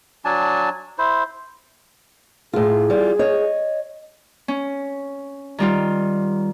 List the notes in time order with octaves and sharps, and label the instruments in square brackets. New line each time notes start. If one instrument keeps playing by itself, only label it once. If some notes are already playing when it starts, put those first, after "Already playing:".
[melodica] F#3 D4 G#5 A5
E4 C5
[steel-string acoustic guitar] A2 F4 [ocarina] G#4
[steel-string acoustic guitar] G3 F4
C#5 D#5
[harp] C#4
D#3 G3 F4